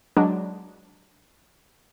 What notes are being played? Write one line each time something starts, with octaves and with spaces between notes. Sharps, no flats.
F#3 G#3 D4